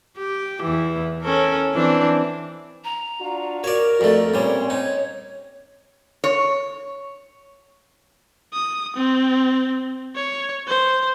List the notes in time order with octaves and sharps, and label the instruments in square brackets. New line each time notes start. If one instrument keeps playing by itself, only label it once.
[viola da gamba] G4
E2 E3
C#4 A4 A#4
E3 C4 D4
[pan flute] A#5
[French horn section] D4 F4 F#4
[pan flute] F#4 [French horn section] A#4 [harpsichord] C#5 D5
[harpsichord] F2 A3 [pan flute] D5
[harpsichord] A#2 G3 [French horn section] C4 C#4 [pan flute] C#5
[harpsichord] D#4 [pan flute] C#5
[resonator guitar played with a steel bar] C#5
[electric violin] D#6
C4
C#5
C5